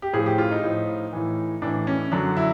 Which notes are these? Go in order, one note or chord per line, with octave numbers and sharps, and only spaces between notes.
G4
A2 F3 G#4
G4
F4
D#4
A2 F3
A2 E3
A2 E3 D4
C#4
F#2 D3 F#3 D4
E4